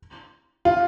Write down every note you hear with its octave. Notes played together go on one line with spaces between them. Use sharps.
F4